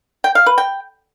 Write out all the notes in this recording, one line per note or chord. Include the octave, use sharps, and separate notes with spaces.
G5
F5
B4
G5